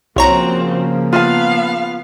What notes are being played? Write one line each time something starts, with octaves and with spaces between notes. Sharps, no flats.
C2 C#3 F3 A#3 C4 F#4 C#5 A#5
B3 F4 F5 A5